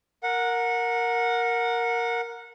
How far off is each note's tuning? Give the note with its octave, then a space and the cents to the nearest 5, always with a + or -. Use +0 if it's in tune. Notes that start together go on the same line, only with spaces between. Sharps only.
A#4 +0 F#5 -20